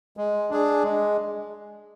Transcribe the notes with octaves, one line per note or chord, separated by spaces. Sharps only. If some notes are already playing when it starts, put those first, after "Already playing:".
G#3
D4 G#4
G#3